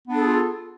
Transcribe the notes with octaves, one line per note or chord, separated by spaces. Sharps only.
B3 D4 F4 G#4 A4